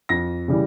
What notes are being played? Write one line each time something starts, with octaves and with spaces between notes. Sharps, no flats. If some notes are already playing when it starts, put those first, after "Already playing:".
F2 A#6
C#3 E3 G3